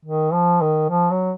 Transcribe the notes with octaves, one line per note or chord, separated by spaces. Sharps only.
D#3
F3
D#3
F3
F#3